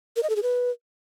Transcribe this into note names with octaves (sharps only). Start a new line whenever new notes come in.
A#4
D#5
A4
G#4
B4